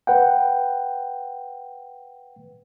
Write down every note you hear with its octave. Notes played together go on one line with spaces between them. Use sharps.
B4 F#5 G5